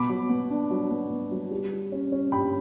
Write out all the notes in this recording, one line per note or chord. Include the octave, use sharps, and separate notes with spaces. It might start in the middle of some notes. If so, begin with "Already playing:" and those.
Already playing: B2 B5 D6
F#3
B3
D4
F#3
B3
B3
F#3
G3
G3
C#4
C#4
G2 G5 B5